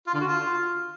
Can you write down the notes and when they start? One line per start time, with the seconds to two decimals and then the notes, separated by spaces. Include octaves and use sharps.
0.07 F4
0.14 D3
0.21 F#4
0.27 F4